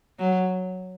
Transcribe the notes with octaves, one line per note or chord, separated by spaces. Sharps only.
F#3